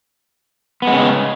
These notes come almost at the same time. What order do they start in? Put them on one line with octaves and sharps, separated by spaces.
B3 G#3 C#3